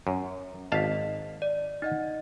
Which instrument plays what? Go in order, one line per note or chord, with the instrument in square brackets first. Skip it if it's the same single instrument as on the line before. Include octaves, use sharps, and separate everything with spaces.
[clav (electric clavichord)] F#2
[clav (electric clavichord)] G#1 F5 A5 [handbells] D#5 B6
[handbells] D5
D#4 D#5 F#5